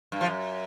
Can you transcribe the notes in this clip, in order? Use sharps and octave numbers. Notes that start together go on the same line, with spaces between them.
G2
F3
F#2